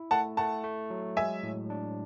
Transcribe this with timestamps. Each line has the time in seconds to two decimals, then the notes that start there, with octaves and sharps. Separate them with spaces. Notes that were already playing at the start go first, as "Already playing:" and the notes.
Already playing: E4
0.11 A3 F#5 A5
0.37 A3 F#5 A5
0.64 A3
0.90 F#3
1.17 G#3 E5 G#5
1.43 A2
1.70 D4